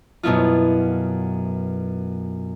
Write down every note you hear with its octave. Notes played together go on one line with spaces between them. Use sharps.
F#2 B2 B3 E4 F4